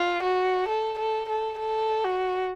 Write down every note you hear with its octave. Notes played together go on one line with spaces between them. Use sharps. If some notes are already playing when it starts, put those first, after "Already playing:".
Already playing: F4
F#4
A4
A4
A4
A4
F#4